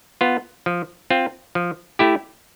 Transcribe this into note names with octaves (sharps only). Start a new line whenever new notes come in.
B3 F4
F3
C4 F4
F3
A3 E4 G4